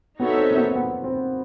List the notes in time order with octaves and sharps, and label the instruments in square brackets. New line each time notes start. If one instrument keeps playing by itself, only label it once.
[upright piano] B3 [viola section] D#4 F#4 A4 C#5 E5
[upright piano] C4
A#3
B3
B3
C4